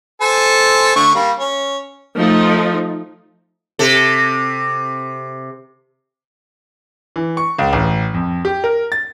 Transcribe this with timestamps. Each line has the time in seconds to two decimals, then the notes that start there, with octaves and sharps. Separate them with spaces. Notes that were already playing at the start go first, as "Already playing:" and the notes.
0.21 A4 C5 G#5
0.95 D3 A3 C#6
1.14 G3 A#3
1.39 C#4
2.18 F3 A3 D#4
3.79 C3 A4
7.16 E3
7.37 C#6
7.58 C#2
7.73 A1
8.14 F2
8.45 G4
8.64 A#4
8.92 A6